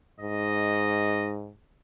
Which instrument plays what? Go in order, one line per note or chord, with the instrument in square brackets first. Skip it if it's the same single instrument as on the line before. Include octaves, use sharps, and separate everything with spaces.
[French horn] G#2 [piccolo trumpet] D#5